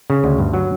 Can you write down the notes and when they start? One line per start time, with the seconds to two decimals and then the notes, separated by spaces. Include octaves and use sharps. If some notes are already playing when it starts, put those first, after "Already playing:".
0.10 C#3
0.24 D2
0.38 G2
0.54 F#3